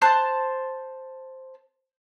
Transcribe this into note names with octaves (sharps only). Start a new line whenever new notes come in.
C5 A5 F#6